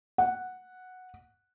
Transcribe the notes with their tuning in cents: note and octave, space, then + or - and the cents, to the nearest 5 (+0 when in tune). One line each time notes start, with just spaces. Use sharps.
F#5 -5